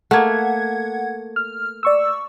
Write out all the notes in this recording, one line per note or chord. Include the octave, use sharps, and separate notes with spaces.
A3 A#3 F#5 G#6
F6
D5 C#6 E6